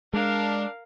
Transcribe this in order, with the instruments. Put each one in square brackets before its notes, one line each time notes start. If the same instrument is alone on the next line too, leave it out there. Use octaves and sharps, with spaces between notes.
[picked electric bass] G#3 [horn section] D4 [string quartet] A#4 F5